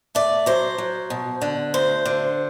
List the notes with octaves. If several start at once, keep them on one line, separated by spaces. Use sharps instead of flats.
A3 D5
F#3 C5
F#3
B2
D3
D2 C5
D3